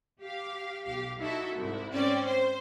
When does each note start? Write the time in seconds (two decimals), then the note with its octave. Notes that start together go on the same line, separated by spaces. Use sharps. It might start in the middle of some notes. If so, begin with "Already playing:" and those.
0.21 G4 F5
0.86 B1 G4 F5
1.19 D#4 E4 F#4 A4 E5
1.56 C2 G#2 E4
1.92 C4 C#4 D5
2.27 C5